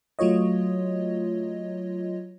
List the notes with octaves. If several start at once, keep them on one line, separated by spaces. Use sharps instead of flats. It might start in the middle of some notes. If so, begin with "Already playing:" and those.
F#3 A3 F4 C#5 D#5